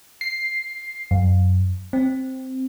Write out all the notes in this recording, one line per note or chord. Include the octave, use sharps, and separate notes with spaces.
C7
F#2
C4